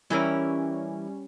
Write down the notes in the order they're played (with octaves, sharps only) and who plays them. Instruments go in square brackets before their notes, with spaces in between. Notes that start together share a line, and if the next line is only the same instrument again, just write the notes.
[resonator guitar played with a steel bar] E3 E4 A#4 [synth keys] G3 C#4